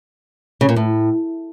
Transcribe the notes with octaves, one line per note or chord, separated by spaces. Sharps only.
C#3
A#2
A2